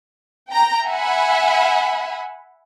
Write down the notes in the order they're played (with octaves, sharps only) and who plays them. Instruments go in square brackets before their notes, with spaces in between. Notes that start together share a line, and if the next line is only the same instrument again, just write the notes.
[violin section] G5 A#5
E5 F#5 G#5 B5